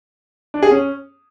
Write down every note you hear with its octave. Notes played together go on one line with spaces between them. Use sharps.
D4
G#4
C#4